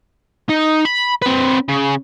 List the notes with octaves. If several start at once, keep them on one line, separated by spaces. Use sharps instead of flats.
D#4
B5
C4 B4
C#3